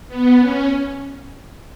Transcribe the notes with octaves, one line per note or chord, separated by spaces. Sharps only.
B3
C#4